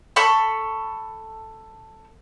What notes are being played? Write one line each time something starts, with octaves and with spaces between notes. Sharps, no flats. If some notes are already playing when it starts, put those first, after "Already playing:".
A4 B5 C#6